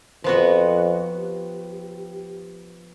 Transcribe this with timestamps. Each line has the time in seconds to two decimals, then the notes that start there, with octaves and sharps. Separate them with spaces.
0.24 F2 F3 B3 F#4
1.16 G4